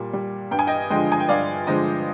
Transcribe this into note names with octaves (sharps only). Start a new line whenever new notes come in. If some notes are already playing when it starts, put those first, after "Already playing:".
Already playing: A#2 G3
G3
G2 G5
G#5
D#5 G5
D3 F3 G#3 D#5 G5
G#5
G5
G2 D5 F5
D3 F3 G#3 C5 D#5